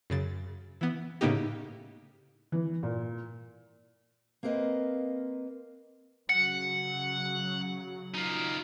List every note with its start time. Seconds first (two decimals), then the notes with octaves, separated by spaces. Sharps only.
0.10 F#2 C#3 A6
0.81 E3 B3
1.21 A2 C#3 A#3 B3 D#4 G4
2.52 E3
2.83 A#2
4.43 A#3 C4 A#4 B4 D#5
6.29 C#3 F#3 F#5 C#7
8.14 D#4 F4